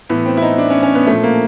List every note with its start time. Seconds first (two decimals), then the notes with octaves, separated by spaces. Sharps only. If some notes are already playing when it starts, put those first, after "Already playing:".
0.09 A2 E3 B3
0.26 C4
0.37 E4
0.42 D#4
0.58 D4
0.70 C#4
0.83 C#4
0.95 B3
1.06 A#2 F3 A3
1.23 A#3